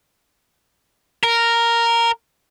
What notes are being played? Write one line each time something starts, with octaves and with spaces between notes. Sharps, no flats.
A#4